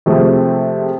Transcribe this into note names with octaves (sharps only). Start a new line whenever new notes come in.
C3 F3 G#3 A3